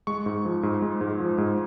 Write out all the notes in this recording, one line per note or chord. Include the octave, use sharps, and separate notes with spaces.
G#3 C#6
G#2
F3
G#2
G#3
G#2
F3
G#2